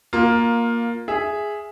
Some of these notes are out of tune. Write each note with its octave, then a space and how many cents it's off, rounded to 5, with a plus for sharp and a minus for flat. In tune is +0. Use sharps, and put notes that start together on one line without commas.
A#3 +5 F4 +15
G#4 +0 E5 +0